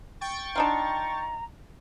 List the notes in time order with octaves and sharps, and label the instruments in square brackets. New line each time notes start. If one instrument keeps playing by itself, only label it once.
[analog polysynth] G5 C#6 A6
[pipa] D4 D#4 F4 [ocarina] A#5